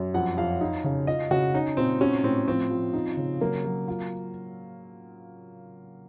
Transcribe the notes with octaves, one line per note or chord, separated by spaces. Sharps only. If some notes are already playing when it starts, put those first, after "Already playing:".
Already playing: F#2
F2 F#5
F2 F5
D#4
C#3
F4 D#5
C#3 F#4
C#4 D#4
A#2 C4
C#4 F#4
A2 C4
F3 C4
F3
D#4
C#3
F#3 A#3
F#3
F4